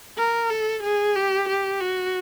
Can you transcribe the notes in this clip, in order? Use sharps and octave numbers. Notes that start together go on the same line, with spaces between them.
A#4
A4
G#4
G4
G4
F#4